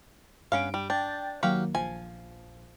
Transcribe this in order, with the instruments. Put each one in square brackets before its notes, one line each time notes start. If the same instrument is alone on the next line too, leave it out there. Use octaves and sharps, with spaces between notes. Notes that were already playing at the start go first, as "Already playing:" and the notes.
[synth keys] G2 D7 [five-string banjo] B3 C#4 F5
[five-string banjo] G3
[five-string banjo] D4 [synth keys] G5 G6 A6
[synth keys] D#3 F#3 A#3 [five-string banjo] F#4 G4 F5
[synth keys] A#1 [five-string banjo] F3 G#5